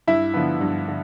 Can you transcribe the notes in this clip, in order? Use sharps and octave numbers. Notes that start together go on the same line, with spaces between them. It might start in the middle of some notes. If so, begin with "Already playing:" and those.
G2 E4 E5
D3 F3 B3
G2
D3